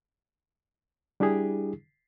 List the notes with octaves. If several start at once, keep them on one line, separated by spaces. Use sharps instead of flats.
G3 D4 E4 G4 G#4